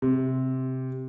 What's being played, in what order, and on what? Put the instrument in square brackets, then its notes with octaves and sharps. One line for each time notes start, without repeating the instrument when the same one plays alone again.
[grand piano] C3